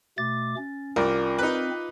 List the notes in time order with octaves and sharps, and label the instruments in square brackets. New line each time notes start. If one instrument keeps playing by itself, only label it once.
[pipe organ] B2 A3 D6 [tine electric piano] A6
[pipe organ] C#4
[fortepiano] C2 [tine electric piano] F4 D6 [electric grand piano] A#4 D5
[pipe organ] C4 [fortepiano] D#4 B4